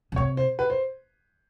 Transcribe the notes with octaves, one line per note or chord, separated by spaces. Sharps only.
C#3
C3 C#5
C5
B4
C5